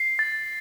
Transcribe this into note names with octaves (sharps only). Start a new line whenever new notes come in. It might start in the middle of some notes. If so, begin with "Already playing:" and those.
Already playing: C7
A6